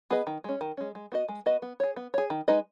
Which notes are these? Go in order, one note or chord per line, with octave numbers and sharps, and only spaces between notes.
B3 G#4 B4 D#5
D#3
G#3 C#4
D#3
G#3 C#4
G#3
B3 F#4 B4 D#5
G#3
B3 F#4 B4 D#5
B3
G#4 C#5
B3
G#4 C#5
D#3
G#3 D#4 B4 D#5